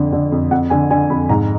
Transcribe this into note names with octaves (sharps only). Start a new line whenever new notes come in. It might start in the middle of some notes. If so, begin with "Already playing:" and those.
Already playing: F2 D3
D3
F2
F2 F#5
D3 G#5
D3 G#5
F2 B5
G#2 A#5